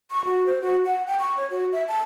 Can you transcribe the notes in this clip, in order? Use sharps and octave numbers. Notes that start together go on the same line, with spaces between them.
C#6
F#4
C5
F#4
F#5
G5
C#6
C#5
F#4
E5
A5